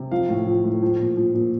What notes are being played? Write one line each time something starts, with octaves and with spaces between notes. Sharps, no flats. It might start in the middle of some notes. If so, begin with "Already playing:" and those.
Already playing: C3
F3 F5
A2
F3
A2
F3
A#2
F3
A#2